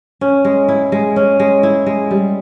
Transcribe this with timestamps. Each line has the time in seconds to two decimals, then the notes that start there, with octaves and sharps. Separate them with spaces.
0.21 C#4
0.45 G#3
0.68 E4
0.92 G#3
1.16 C#4
1.40 G#3
1.63 E4
1.86 G#3
2.11 G3